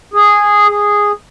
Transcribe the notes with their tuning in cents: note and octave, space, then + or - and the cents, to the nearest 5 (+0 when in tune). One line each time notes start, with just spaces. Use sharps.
G#4 -5
G#4 -10